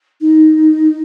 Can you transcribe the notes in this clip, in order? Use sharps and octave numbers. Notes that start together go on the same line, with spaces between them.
D#4